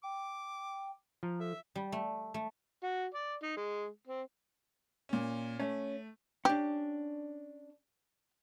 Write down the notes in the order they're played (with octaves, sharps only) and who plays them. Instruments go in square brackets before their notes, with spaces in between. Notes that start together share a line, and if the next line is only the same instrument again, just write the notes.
[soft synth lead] G5 [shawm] D6
[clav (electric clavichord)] F3 [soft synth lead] A#5
[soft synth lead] A4 [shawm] E5
[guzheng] G3
A3
A3
[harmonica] F#4
D5
D#4
G#3
C4
[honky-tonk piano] A#2 C#4
[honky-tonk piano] A3 [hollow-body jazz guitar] C#4
[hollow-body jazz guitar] C#4 D4 [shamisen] G4